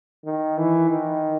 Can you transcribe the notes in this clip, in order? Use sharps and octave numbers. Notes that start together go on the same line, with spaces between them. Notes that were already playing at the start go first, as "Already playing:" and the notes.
D#3
E3
D#3